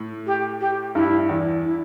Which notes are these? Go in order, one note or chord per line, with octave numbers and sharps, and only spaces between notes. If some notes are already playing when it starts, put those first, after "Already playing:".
Already playing: A2
G4
G4
G2 E4
E2
E4